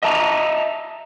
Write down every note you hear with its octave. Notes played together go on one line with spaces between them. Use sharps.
D#5 E5 A5 A#5